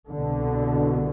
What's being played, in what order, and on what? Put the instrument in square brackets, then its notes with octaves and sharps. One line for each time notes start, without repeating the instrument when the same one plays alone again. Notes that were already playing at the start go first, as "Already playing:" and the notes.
[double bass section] C2 B2 D3